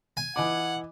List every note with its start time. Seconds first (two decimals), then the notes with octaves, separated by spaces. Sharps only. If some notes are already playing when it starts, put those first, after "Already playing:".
0.17 G#5
0.36 E3 D#5 F#5 D6